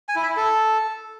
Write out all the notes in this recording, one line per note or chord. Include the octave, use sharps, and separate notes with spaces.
G#5
E4
E5
E4
A4